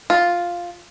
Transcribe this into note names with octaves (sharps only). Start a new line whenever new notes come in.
F4